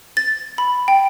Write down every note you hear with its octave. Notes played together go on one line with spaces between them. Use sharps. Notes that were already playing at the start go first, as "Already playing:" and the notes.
A6
B5
G5